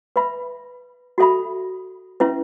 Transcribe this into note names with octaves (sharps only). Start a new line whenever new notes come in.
B4 E5 B5
F#4 A4 E5 B5
C#4 E4 B4 E5